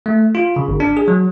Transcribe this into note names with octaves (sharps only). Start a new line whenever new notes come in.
A3
F4
C#3
G1
D4
G#4
F#3